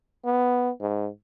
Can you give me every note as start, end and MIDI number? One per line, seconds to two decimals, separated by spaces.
0.25 0.70 59
0.81 1.08 44